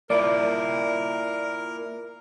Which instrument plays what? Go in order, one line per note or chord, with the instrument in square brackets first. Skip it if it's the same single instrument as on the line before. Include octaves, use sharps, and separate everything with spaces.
[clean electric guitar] A#3 E4 F4 [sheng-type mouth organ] A#4 [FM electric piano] D5